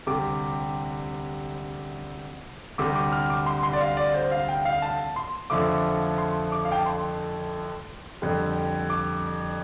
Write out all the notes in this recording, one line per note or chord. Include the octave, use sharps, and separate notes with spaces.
D2 C3 G3 D6
D2 C3 G3 D6
D6
F6
D6
C6
C6
D5
F5
D5
C5
F5
G5
F5
A5
C6
F2 D3 F3 A3 D6
C6
D6
F5
G5
A5
C6
F2 D3 G3
D6